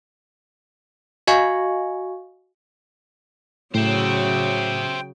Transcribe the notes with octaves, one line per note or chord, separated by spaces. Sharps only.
F#4 D#5 F5 G#5 C#6
A2 C#3 F#3 C5 E5 G5